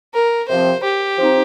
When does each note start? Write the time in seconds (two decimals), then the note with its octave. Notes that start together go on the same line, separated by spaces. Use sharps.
0.14 A#4
0.48 C3 F3 C4 C5
0.83 G4
1.18 F3 C4 D#4